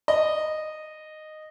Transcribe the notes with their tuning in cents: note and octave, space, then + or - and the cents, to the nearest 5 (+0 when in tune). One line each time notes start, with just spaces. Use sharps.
D#5 -10